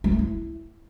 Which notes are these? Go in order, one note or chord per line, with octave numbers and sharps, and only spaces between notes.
G#3
A3
E4